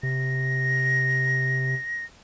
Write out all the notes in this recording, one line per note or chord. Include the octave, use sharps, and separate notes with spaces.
C3 A#6